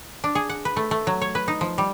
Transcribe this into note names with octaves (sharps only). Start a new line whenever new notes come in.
D4
G#4
F#5
B4
A3
A3
F#3
C#5
B4
D#4
F3
G3